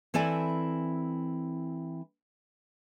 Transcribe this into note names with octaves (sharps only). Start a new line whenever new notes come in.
E3 C4 E4 A4 D5 G#5